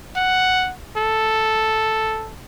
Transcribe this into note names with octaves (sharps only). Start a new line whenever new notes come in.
F#5
A4